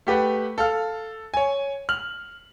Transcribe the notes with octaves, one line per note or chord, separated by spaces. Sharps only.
A3 G4 B4 F#5
A4 F5 F6
C#5 G#5
F6 F#7